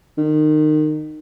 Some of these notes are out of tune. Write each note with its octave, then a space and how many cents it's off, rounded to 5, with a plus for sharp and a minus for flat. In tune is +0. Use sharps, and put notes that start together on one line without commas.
D#3 -25